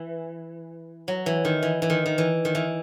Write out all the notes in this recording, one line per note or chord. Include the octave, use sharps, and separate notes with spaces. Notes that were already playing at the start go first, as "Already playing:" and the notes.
Already playing: E3
F#3
E3
D#3
E3
E3
D#3
D#3
E3
D#3
E3